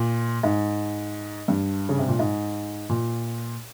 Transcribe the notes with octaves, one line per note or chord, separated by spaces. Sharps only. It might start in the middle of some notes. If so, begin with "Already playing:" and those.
Already playing: A#2
G#2
G2
C#3
C3
A#2
G#2
A#2